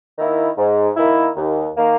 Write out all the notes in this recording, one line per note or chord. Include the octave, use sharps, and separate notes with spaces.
D#3 A#3 E4
G#2
D#3 A#3 E4
D#2
D#3 A#3